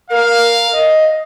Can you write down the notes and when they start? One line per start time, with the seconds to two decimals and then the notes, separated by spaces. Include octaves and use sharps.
0.10 A#4 F5
0.72 D#5